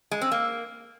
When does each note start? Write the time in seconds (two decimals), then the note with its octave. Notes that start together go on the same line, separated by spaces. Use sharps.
0.11 G#3
0.21 C4
0.32 A#3